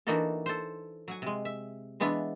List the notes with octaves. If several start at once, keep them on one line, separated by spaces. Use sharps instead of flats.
E3 A#3 D4 D#4 F#4 A4
A4 C5
F#3 F#5 G#5
C3 G#3
E5
E3 G#3 B3 D4 E4